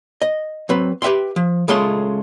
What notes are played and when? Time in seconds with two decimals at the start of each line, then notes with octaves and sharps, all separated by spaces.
0.22 D#5
0.69 F#3 C4 B4
1.02 G4 B4 E5 G5 C6
1.36 F3
1.68 C#2 C#3 G#3 A3 F4 C6